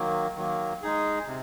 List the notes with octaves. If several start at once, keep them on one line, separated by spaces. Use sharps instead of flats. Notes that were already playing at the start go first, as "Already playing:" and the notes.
Already playing: D#3 F#3 A#3
D#3 F#3 A#3
G#3 D#4 G#4
C3